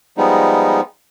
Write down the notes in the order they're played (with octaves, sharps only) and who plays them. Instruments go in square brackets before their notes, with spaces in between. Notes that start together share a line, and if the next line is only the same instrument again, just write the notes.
[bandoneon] F3 G3 G#3 B3 D#4